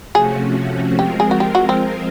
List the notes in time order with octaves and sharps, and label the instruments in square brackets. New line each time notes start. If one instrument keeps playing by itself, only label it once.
[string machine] C3 F3 A3 C#4 F#4 [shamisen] G#4
[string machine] F3 G#3 C4 F4 A#4 [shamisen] G4
[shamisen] G#4
F#4
G4
F#4
C4